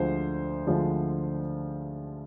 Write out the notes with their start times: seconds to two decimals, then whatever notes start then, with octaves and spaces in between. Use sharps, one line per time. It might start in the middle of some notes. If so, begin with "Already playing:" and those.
Already playing: D2 D3 F3 G#3 C5
0.67 D2 D3 F3 G#3